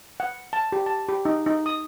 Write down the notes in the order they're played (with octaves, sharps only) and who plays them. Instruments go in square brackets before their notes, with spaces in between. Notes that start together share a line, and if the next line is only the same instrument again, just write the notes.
[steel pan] F#5
A5
G4
A5
G4
D#4
D#4
D#6